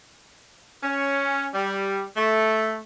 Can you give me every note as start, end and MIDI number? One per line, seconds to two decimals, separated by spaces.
0.83 1.47 61
1.54 2.04 55
2.17 2.78 57